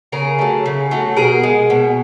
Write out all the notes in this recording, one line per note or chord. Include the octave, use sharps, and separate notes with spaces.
C#3 G#4 A#4
F#3 A3
C#3
F#3 A3
B2 G#4 A#4
G#3
B2